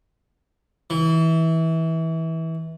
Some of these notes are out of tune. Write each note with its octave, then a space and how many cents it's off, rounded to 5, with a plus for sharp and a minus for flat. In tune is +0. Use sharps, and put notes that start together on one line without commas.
E3 -25